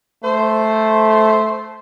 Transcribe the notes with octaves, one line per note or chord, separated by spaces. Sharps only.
A3 C5